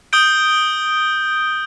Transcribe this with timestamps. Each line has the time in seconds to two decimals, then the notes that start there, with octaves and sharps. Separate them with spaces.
0.13 D#6 G6 D7 G7